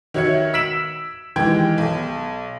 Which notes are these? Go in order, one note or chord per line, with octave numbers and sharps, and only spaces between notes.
D#3 F#4 C#5 E5 G#6 C#7
E6 B6 D7 E7 F#7
D#3 E3 G#3 G4 G5 G#6
B1